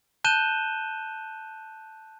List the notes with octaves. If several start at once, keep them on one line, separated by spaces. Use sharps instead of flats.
A5 F#6 G6 D#7 E7 G7